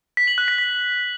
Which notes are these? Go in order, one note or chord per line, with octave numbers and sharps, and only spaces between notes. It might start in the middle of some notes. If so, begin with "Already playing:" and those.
B6
F#7
F#6
B6
B6